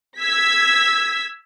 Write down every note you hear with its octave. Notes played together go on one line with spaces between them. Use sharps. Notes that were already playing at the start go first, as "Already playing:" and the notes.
E6 G#6 B6